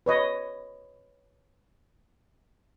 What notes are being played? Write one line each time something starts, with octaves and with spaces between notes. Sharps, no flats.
B4 C#5 D#5